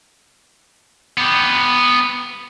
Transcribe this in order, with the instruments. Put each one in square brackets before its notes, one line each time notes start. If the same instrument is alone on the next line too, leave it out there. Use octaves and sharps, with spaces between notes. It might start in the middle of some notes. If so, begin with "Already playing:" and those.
[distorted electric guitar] B3 G4